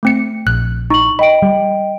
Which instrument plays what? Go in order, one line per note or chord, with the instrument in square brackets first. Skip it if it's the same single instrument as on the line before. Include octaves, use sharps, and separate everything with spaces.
[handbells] A3 C4 C#7
[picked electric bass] A#1 [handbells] F#6
[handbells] D#4 [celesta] C#6 F#7
[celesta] D#5 G5 D7 [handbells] B5
[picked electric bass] G3